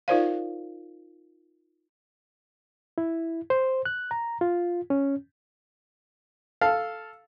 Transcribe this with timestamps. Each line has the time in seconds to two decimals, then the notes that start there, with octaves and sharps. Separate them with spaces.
0.08 D#4 F4 A#4 C5 D5 F5
2.98 E4
3.50 C5
3.85 F#6
4.11 A#5
4.41 F4
4.90 C#4
6.61 A4 F5